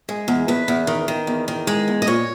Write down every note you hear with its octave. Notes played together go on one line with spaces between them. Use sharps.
G#3
E2
E2 B4
E2
D#3
D#3
E2
D#3
G#3
E2
D#5
A#2 C#5